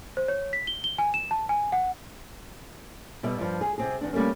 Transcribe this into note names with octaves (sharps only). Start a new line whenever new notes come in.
C5
C#5
B6
G7
G7
G#5
E7
A5
G#5
F#5
B2 G3 B3 E5
G2 F3
G#4
C3 C4 G#4
E2 D4
G3 A3 A#3 C#4